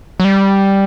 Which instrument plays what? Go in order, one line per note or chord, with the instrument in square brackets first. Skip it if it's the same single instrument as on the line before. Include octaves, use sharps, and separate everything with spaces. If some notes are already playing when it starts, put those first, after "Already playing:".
[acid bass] F#3
G3